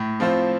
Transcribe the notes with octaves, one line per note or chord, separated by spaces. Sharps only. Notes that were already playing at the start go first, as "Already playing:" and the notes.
Already playing: A2
F3 C4 F4 C5